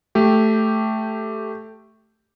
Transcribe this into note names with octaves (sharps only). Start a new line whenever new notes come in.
A3 G4